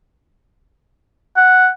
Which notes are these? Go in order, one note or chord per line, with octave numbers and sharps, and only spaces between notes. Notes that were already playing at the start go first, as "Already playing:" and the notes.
F#5